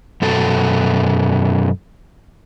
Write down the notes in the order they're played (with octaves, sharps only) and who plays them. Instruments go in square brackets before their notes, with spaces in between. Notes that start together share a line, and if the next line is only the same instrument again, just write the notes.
[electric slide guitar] F#2 B2 A4